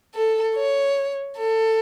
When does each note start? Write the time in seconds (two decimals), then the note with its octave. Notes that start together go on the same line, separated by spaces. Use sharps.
0.15 A4
0.55 C#5
1.38 A4